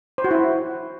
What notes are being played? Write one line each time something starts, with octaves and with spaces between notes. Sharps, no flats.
C5
F#4
E4